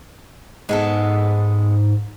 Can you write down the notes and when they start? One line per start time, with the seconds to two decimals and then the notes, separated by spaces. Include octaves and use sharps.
0.69 G#2 G#3 B3 A4